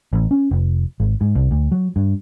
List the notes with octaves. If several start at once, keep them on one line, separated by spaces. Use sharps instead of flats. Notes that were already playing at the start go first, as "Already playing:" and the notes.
A1
C#4
F1
G#1
G#2
C2
D2
F#3
G2